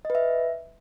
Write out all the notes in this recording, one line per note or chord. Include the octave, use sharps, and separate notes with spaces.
D#5
B4
E5